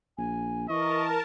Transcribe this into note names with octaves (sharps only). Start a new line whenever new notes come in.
A#1 G#5
E3 A#4 D#5 A5 C#6